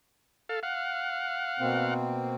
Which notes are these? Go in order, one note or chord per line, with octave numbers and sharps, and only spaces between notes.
A4 F5
F5 F#5
B2 A#3 C4